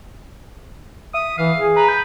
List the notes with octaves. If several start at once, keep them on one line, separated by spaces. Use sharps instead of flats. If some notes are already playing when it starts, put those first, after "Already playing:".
E5 D#6
E3 F5
G#4
B4 A#5
G6